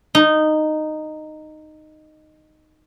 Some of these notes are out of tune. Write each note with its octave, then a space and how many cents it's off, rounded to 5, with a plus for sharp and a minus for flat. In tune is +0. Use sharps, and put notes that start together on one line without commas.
D#4 -10